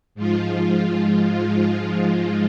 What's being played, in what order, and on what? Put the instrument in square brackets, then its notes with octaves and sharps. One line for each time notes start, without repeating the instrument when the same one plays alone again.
[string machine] G#2 F3 G#3 F4